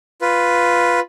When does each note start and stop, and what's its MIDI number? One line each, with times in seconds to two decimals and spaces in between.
0.21 1.00 65
0.21 1.00 71